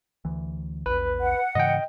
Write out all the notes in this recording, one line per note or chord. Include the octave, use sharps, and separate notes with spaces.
D2 E3
A#1 E2 B4
F#5
G#2 C#3 E3 D#5 G5